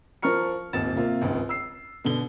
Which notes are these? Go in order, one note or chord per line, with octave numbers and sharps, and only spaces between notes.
F3 A#4 C#6 F6 C#7
D#1 G#1 A6 E7
C3 A#3 F4
G#1 C#2 F#2
E6 C7
B2 D3 G7